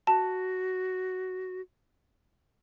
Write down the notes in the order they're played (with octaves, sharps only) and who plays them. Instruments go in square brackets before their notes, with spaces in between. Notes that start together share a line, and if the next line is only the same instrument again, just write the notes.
[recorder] F#4 [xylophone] A5